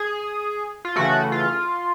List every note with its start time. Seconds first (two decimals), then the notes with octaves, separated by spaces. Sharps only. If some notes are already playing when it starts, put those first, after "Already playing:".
Already playing: G#4
0.85 F4
0.96 C#3 E3 A3 F#4
1.32 F4